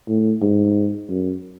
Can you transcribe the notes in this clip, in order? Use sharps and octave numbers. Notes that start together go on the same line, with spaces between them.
A2
G#2
F#2